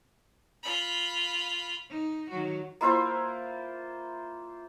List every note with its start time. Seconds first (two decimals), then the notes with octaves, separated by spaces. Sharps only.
0.63 F4 B5
1.89 D#4
2.30 D#3 F#3 F#4
2.81 A#3 E4 F4 C5